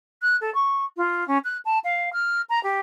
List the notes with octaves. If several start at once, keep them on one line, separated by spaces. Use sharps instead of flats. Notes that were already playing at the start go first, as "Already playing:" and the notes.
F#6
A4
C#6
F4
C#4
F#6
A5
F5
F6
A#5
G4